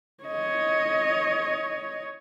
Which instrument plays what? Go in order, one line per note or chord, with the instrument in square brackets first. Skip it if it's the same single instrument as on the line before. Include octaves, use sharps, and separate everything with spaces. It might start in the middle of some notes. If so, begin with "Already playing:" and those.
[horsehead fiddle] C#5 D#5